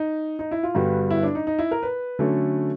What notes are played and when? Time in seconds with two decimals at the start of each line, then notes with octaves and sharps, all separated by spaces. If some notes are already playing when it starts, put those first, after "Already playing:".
Already playing: D#4
0.39 D#4
0.51 E4
0.63 F4
0.75 G2 D3 G3 B3 F#4
1.10 E4
1.23 D4
1.35 D#4
1.47 D#4
1.59 E4
1.71 A#4
1.83 B4
2.19 D3 F#3 A3 C#4